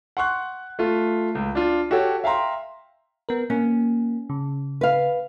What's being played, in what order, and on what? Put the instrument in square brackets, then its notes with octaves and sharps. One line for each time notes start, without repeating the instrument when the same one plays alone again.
[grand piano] F#5 C6 C#6 F#6
A3 F4
C#2
D4 F4
F#4 G4 A4 C#5
E5 F5 G5 A#5 C6
[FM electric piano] B3 A#4
[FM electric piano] A#3 [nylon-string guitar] C#4
[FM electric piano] C#3
[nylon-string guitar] B4 F5